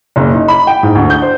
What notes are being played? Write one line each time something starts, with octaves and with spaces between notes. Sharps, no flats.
F#1
D#4
B5
G5
G#2
D2
G6
C5